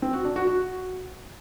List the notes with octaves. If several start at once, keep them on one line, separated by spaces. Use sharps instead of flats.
C4
F#4
D4
F#4
F#4